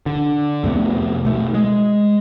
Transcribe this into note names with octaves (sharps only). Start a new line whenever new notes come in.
D3
F2 C3 A3 B3
B2 A3
G#3